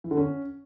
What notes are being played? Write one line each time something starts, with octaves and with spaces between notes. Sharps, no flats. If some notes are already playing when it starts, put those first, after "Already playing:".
E3
D3
C#4